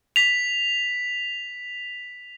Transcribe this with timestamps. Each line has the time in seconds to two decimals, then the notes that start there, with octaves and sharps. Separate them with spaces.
0.16 B6 F7